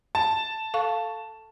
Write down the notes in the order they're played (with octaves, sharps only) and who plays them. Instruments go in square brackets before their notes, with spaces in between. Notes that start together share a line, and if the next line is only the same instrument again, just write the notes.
[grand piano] A5
[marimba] A4 F5 C#6